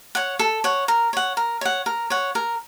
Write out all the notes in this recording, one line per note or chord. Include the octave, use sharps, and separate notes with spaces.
C#5 F#5
A4
C#5 F#5
A#4
C#5 F#5
A#4
C#5 F#5
A#4
C#5 F#5
A#4